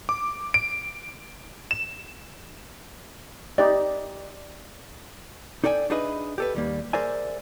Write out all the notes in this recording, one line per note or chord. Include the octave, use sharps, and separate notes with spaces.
D6
D7
E7
D#4 G4 D5
D#4 A4 D5 G5 G#5
D4 D#4 G#4 B4 D#5 E5
G4 A4 B4
D#2 G3 A#3
G#4 A#4 C5 D5 E5 G#5